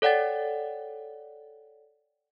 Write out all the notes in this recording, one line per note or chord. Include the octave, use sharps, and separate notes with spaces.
A4 C#5 D5 F#5 G5 A6